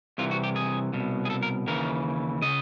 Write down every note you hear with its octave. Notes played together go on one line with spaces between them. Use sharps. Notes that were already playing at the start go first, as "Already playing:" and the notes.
C2 C3 E3 F4
F#4
G4
G#4
C2 B2
G#4
A4
A#4
D#2 C#3 E3 A#4
C#3 D#5